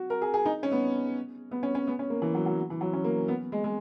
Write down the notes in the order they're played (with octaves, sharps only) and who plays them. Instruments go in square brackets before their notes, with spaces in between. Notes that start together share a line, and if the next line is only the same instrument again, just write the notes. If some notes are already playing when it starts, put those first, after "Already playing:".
Already playing: [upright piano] F#4
A#4
G#4
G#4
D#4
C#4
B3
B3
C#4
C#4
B3
C#4
A#3
E3
F#3
F#3
E3
F#3
C#4
A#3
B3
G#3
G#3